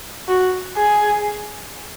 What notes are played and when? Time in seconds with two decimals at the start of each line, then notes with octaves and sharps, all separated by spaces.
0.28 F#4
0.77 G#4